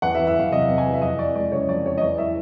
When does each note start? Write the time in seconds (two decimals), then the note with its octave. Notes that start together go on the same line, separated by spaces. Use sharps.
0.02 E2 F#5
0.15 E5
0.18 E3
0.27 E5
0.36 E2 F5
0.52 C3 D#5
0.68 E2
0.78 G#5
0.86 E3
0.94 E5
1.02 F2 D#5
1.19 E3 D5
1.35 G#3 D5
1.52 C#3 C#5
1.68 F2 D5
1.86 E3 C#5
1.98 D#5
2.01 E2 D5
2.18 E3 E5